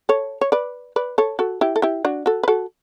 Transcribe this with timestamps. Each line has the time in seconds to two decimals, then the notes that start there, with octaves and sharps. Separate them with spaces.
0.09 A4 C#5
0.41 C#5
0.52 B4 D5
0.96 B4 D5
1.18 A4 C#5
1.39 F#4 A4
1.61 E4 G4
1.76 A4
1.82 E4 G4
2.05 D4 F#4
2.26 F#4 A4
2.43 B4
2.48 F#4 A4